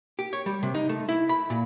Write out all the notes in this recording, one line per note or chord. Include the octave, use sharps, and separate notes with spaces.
G4
C#5
G3
C3
D#4
A3
E4
B5
A#2